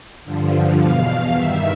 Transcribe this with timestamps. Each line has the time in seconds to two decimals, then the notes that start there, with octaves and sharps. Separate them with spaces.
0.24 G2 D3 F3
0.79 E2 B2 F5
1.34 G2 D#3 E5